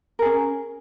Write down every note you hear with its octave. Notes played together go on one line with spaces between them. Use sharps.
C#4 G#4 A#4